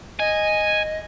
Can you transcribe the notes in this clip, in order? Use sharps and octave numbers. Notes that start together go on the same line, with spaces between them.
D#5 G#5